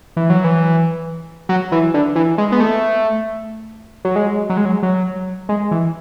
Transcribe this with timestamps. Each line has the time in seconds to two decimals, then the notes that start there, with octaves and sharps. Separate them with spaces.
0.17 E3
0.30 F#3
0.44 E3
1.49 F#3
1.72 E3
1.94 D3
2.16 E3
2.38 G#3
2.52 B3
2.60 A3
4.05 F#3
4.16 G#3
4.50 F#3
4.57 G#3
4.65 F#3
4.83 F#3
5.49 G#3
5.71 E3